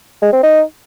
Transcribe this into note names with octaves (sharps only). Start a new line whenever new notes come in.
G#3
C4
D#4